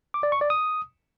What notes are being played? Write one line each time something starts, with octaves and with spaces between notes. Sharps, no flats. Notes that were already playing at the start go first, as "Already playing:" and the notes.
D6
D5
C#6
D5
D#6